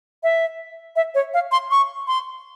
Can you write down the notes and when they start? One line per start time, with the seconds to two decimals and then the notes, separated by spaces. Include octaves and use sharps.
0.23 E5
0.96 E5
1.15 C#5
1.34 F5
1.52 C6
1.71 C#6
2.08 C6